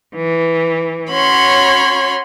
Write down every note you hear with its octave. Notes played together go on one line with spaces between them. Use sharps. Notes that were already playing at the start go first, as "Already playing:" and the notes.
E3
C#4 F#4 C#5 B5 C6